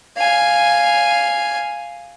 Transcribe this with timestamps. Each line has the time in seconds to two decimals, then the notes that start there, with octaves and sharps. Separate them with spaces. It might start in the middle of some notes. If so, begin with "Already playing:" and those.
0.18 F5 G#5